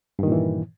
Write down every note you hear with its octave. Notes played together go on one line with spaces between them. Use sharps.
G2 A#2 D#3 E3